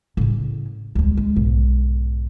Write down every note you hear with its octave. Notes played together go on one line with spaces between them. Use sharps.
A2 C#3
D2 G#3
G3 G#3
B1 G#2